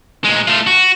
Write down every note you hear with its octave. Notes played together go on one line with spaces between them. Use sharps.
A#2 G#3
A3 F4
F#4